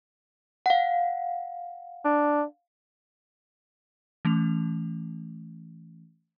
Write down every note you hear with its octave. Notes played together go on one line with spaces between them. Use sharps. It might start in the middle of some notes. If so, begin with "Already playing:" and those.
F5 F#5
D4
E3 A3 C#4 F7